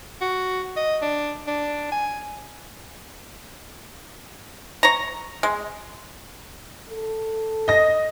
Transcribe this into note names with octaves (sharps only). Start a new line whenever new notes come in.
F#4
D#5
D4
D4
G#5
C#5 A#5
G#3
A4
D#5 A#6